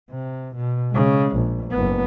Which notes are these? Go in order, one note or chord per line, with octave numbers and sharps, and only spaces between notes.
C3
B2
C#3 G#3
A#1
F#1 B3